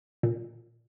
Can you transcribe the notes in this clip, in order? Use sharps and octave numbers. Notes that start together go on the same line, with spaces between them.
A#2